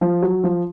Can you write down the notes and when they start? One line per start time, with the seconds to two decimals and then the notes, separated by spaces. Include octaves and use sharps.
0.01 F3
0.22 F#3
0.44 F3